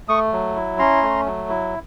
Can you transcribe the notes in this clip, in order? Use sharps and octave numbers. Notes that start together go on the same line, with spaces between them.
A3 C#6 D#6
F#3
E4
C#4 A#5 C6
A3
F#3
E4